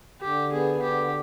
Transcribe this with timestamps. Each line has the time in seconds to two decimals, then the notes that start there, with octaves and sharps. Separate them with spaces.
0.21 D3 G4
0.52 B3 G#4
0.82 D3 G4